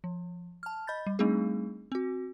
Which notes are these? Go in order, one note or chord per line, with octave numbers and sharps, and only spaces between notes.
F3
A5 F6
D#5 B5 G6 A6
G3
G3 A3 C4 D4 D#4 G#4
C4 F#4